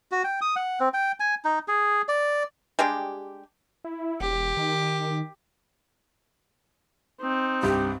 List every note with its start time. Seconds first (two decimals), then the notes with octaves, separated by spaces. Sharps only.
0.11 F#4
0.24 G5
0.42 D#6
0.56 F#5
0.80 C4
0.94 G5
1.20 G#5
1.45 D#4
1.68 G#4
2.08 D5
2.79 G3 G#3 D4 G4
3.84 E4
4.21 E1 G4
4.57 D#3
7.22 C4 D#4
7.63 C2 G2 G4